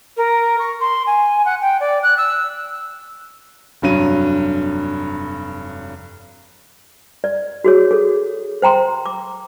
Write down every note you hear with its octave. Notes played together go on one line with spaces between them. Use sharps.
A#4
C#6
C6
G#5
F#5
G5
D5
F#6
E6
F1 G2 F#3 D#7
D5
F#4 G#4 C#5
G#4 A4
C5 G5 A#5 C6
D6